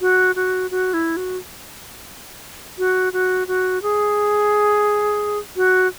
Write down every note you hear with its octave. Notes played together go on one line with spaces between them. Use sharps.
F#4
F#4
F#4
E4
F#4
F#4
F#4
F#4
G#4
F#4